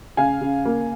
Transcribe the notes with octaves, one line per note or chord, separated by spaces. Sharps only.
C#3 F5 G#5
C#3
A#3